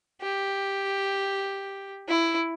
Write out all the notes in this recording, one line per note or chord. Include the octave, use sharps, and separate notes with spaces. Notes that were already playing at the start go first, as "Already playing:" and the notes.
G4
E4